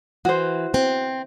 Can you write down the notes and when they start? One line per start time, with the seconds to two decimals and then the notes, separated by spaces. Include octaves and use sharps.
0.25 E3 F#4 C5
0.74 C4